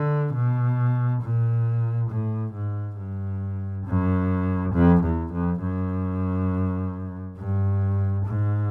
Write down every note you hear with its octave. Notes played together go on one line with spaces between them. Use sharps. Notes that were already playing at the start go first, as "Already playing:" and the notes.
Already playing: D3
B2
A#2
A2
G#2
G2
F#2
F2
E2
F2
F#2
G2
G#2